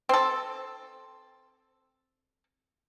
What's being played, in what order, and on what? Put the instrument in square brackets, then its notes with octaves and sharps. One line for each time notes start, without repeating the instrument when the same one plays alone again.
[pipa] C4 A4